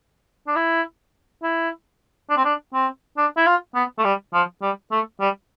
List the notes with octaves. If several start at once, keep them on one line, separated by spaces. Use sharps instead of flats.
D4
E4
E4
D4
C4
D4
C4
D4
E4
F4
B3
A3
G3
F3
G3
A3
G3